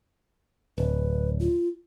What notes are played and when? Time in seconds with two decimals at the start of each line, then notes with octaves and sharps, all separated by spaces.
0.78 D1 B4
1.40 F4